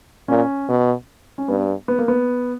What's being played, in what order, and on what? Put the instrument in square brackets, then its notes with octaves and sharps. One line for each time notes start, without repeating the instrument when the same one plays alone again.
[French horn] A#2 [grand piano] C#4
[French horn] B2
[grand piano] C#4
[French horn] G2 [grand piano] B3
[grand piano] B3
A#3
B3